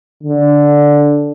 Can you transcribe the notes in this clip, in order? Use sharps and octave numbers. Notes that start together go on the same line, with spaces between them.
D3